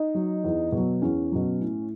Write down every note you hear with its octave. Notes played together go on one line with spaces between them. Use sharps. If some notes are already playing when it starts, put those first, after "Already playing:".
Already playing: D#4
F#3
E2
B2 F#3
E2 C#4
B2 F#3
A2